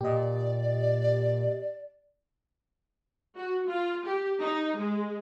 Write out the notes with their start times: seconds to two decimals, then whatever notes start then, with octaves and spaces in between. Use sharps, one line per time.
0.01 A#2 G4 D5 D#5
3.36 F#4
3.68 F4
4.06 G4
4.40 D#4
4.77 G#3